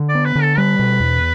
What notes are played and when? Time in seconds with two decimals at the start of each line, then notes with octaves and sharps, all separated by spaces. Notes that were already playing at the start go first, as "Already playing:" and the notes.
Already playing: D3
0.09 D5
0.15 B3
0.25 B4
0.35 D3
0.42 A4
0.57 G3 B4
0.79 B2
1.00 E2